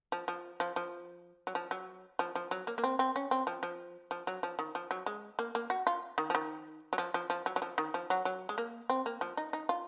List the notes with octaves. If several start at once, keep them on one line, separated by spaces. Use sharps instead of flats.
F3
F3
F3
F3
F#3
F3
F#3
F3
F3
F#3
A#3
A#3
C4
C4
C#4
C4
F3
F3
F3
F#3
F3
D#3
F3
F#3
G#3
A#3
A#3
F#4
F4
D#3
F3
D#3
F#3
F3
F3
F3
F#3
F#3
F3
D#3
F3
F#3
F#3
G#3
A#3
C4
A#3
F3
D#4
D#4
F4